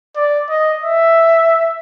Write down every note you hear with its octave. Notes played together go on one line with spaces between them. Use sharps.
D5
D#5
E5